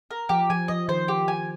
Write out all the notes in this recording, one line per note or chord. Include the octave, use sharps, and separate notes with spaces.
A#4
F3 G4
F3 G#5
F3 D#5
D#3 C5
G4
G#5